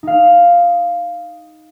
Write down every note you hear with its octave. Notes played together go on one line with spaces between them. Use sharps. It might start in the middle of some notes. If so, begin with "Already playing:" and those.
D#4 F5